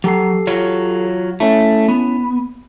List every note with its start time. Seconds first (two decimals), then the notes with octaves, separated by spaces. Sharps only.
0.04 F#3 G4 A4 C7
0.47 F#3 F4 C#5
1.40 A3 C#4 E4
1.88 B3